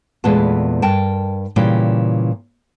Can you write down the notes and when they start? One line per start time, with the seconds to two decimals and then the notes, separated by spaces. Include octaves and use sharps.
0.24 E2 A#2 G#3 A3 B3 A5
0.82 G2 A#4 G5 A5
1.56 A#2 C#3 E3 G3 G4